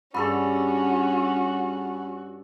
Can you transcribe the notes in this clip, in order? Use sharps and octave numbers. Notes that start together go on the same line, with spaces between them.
G2 C#4 F#4 G#4 A4 D5 B5